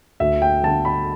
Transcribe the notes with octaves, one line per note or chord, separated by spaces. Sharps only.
D2 E5
G5
D3 A5
B5